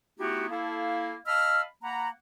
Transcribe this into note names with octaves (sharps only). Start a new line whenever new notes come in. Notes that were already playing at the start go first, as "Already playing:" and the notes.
A3 B3 D#4 E4 F#4 G4
A#3 E4 A4 F5
D#5 F5 A5 B5 E6 F6
A#3 F#5 A#5 B5